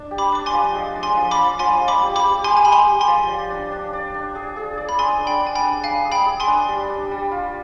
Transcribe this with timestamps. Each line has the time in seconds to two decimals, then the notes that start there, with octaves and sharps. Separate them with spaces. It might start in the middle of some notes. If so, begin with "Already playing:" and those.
Already playing: D4
0.11 G4
0.18 B5 D6
0.32 D4 D6
0.46 G#5 C6
0.53 F3
0.75 G#3
0.96 D4
1.03 G#5 C6
1.17 F3
1.31 B5 D6
1.38 F3
1.59 F3 G#5 C6
1.81 G#3
1.88 B5 D6
2.02 G4
2.16 B5 D6
2.23 G4
2.44 G4 G#5 C6
2.57 G#5
2.65 G#3 B5
2.72 G#5 C6
2.86 G4
3.01 G#5 C6
3.08 F3
3.29 D5
3.50 D4
3.72 D4
3.93 D5
4.14 D4
4.35 G#4
4.56 G#4
4.78 D5
4.89 B5
4.99 D4 G#5 C6
5.19 D4
5.27 G5 B5
5.41 D4
5.47 G#5
5.55 G5 B5
5.63 D4
5.84 D4 F5 G#5
6.05 G#4
6.12 G5 B5
6.26 G#4
6.40 G#5 C6
6.47 D4
6.69 G3
6.90 D4
7.11 G3
7.32 F4